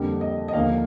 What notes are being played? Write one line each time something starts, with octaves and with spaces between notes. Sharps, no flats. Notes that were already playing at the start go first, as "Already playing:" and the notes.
Already playing: F2 D3 G3 A#3
D#5
D#5
D#2 D3 F3 A#3 F5